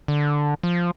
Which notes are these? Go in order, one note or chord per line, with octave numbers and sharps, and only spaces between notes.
D3
F3